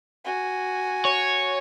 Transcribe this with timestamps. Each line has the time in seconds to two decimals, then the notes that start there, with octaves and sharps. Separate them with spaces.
0.24 F#4 G#5
1.05 C#5